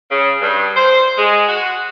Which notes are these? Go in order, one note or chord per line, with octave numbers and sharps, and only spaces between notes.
C#3
G2
C5
G#3
F#4